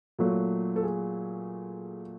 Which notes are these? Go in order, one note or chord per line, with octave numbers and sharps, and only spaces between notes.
A#2 F#3 A3
A4
G#4